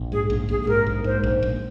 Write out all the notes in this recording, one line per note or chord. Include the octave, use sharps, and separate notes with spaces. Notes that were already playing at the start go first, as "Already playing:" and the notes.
Already playing: A#1
G#2 G#4
A#1
A#1 G#4
G#4
G#2 A#4
A#1
G#2 C5
A#1
A#1